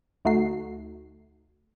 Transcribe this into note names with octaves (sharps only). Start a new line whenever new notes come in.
D2 A3 D#4 F#4 C7